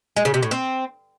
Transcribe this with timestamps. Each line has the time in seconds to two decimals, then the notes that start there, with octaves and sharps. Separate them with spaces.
0.16 G#3
0.25 C#3
0.34 C3
0.43 A2
0.51 C4